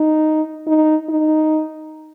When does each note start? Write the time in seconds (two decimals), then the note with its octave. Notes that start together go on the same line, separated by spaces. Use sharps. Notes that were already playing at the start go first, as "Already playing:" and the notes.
Already playing: D#4
0.67 D#4
1.09 D#4